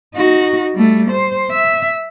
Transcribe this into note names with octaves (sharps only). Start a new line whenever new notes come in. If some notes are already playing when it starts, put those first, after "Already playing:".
D#4 F#4
G3 A3
C5
E5